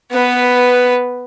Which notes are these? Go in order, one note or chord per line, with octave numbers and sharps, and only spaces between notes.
B3 B4